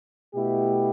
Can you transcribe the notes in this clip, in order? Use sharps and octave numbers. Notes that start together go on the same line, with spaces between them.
B2 A3 E4 G4